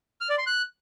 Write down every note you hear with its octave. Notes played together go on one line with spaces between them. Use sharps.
F6
D5
C6
F#6